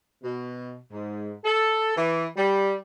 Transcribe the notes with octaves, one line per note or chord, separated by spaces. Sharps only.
B2
G#2
A4
E3
G3